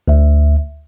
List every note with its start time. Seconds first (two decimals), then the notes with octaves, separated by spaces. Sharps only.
0.08 D2 E5